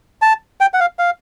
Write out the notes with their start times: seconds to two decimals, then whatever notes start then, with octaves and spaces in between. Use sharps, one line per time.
0.22 A5
0.61 G5
0.74 F#5
0.80 F5
0.99 F5